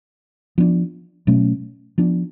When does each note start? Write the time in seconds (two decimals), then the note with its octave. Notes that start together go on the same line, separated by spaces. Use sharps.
0.58 F3 B3 D4
1.27 B2 F#3 A3 C#4
1.98 F3 B3 D4